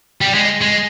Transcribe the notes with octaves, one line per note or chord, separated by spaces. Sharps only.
G3
G#3
G#3